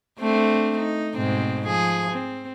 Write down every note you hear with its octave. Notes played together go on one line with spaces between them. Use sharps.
A3 C4 D4
D#4
G#2 B2 C4
F3 G#4
C4